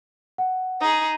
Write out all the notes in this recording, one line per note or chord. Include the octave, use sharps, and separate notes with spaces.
F#5
D#4 G#4 D#6